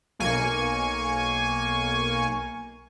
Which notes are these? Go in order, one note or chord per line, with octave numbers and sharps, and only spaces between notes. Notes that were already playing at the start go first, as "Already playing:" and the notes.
B1 A#3 G#5 C#6